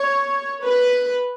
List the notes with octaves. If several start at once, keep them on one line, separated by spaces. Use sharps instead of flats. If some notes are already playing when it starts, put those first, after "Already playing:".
Already playing: C#5
B4